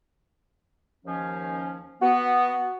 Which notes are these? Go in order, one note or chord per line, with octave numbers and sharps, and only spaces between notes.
D#2 F3 C#4
B3 F#4